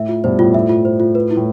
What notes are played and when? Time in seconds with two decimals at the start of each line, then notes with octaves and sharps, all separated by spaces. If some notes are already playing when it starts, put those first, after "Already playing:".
Already playing: A2 E5
0.09 F4
0.24 G2 B2 C5
0.39 A2 F4
0.54 A2 E5
0.69 F4
0.85 C5
1.00 F4
1.15 B4
1.31 E4
1.37 A2